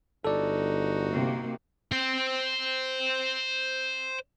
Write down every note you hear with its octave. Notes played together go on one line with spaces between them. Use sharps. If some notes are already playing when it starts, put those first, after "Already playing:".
G1 D#4 F#4 A4 D5
C3 A#3
C5 G5